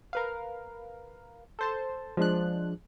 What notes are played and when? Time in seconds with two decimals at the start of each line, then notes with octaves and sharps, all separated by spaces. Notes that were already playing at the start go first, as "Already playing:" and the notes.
0.13 A#4 B4 F5
1.59 A4 C5 A5
2.17 F3 G#3 D4 F#6